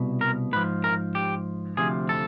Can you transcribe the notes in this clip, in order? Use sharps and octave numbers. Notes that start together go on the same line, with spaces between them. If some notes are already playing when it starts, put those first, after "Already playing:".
Already playing: C2 B2
A#4
G#2 F3 B4
A#4
G4
D2 C3 F3 G#4
A4